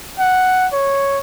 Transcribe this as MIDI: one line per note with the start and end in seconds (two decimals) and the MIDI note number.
0.19 0.66 78
0.73 1.19 73